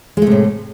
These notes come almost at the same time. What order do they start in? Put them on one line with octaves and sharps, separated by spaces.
G#3 A3 C3 A2